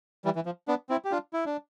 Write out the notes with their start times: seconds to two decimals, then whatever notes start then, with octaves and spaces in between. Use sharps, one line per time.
0.25 E3 G3
0.35 E3
0.46 F3
0.68 B3 D4
0.89 C4 E4
1.05 G4
1.11 D4 F4
1.33 E4
1.46 D4